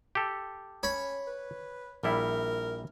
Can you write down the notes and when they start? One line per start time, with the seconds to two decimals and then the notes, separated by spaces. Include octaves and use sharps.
0.15 G4 A4
0.83 C#4 C#5 B5
1.27 B4
2.03 A#1 G3 E4 A#4